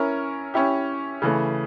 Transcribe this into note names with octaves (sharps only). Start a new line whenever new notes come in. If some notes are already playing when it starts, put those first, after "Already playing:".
Already playing: C#4 E4 A#4
C#4 E4 G4
C#3 E3 A3